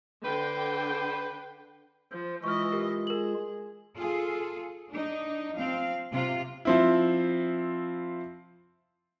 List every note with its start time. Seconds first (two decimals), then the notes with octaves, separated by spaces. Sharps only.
0.25 D3 B4 C5 G5
2.12 F3 C5
2.44 E3 G#3 F4 D#5 C#6 F6
2.72 G4 A#4
3.07 G#4 A#4 F#7
3.95 F4 G#4 A4
4.89 D4 D#4
5.56 F3 C4 F5
6.11 C3 F4
6.65 F3 C4 E4